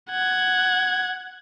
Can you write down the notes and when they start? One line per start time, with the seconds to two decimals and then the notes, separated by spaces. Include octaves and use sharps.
0.10 F#5 G#6